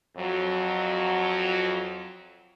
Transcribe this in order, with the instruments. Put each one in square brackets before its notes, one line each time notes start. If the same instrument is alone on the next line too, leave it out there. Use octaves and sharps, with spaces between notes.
[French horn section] F2 F#3